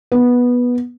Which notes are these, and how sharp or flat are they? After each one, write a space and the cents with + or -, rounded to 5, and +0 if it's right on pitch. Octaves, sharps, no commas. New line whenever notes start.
B3 -10